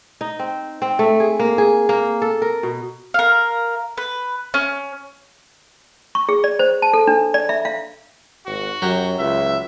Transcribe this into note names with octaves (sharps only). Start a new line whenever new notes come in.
D#4
C4
C4
A3
G#4
A#3
G#4
A#3
A4
A#4
B2
A#4 F5
B4
C#4
C#6
G#4
D5
C5
A5
A4
D4
D5
E5
F5
G#1 F#4
F#2 F#3 G4
C#2 E5